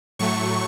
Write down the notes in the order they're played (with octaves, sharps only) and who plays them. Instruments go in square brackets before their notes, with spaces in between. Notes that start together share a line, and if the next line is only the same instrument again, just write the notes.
[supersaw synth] A2 F#3 A3 C#6